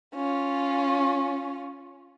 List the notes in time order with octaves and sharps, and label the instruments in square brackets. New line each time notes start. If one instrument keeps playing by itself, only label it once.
[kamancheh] C#4 F4